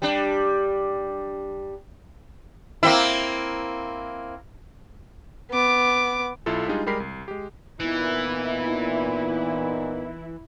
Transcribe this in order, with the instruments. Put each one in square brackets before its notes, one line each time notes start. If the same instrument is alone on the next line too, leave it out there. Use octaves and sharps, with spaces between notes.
[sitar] G3 D4
A#3 C4 E4
[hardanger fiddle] B3 D6
[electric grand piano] B1 E4 F4 A4
G3 G#3 D4 D#4 F4 G#4
G3 G#3 G4 A#4 B5 C7
C2
G#3 G4
[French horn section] A#2 D#4 [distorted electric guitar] E3 [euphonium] B3 [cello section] E4